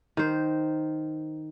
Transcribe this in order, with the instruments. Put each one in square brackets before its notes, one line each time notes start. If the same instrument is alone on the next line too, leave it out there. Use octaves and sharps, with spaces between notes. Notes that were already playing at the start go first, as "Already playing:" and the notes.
[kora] D#3 C5